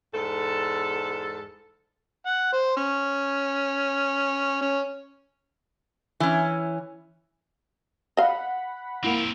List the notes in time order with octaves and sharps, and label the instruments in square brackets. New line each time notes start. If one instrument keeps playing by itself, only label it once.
[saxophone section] E2 G#2 A4
[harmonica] F#5
C5
C#4
C#4
[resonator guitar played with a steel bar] E3 C#4
[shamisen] D#5 F5 [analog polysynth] F#5 B5
[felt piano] A#3 E4 [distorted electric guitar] C4 A#4